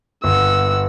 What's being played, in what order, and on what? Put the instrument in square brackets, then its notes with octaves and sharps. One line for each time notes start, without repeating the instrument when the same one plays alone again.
[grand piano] G1 [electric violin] F#5 E6